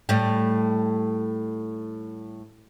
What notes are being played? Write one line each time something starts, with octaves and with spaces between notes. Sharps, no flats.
A2 G3